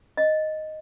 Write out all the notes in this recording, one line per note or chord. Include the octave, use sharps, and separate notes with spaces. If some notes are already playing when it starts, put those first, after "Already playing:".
D#5